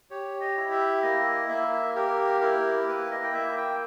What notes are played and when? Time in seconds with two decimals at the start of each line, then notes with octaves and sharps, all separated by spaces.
0.10 G4 C#5
0.41 D#5
0.57 E4
0.71 E5
1.02 A#3 D#5
1.49 A#3 E5
1.95 G4 A#4
2.41 E4 A#4
2.88 A#3 B4
3.11 D#5
3.24 G5
3.33 A#3 E5
3.57 G5